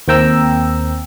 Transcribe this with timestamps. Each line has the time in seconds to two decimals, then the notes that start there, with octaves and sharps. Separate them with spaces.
0.08 D#2 A#3 C4 G5 A#5 E6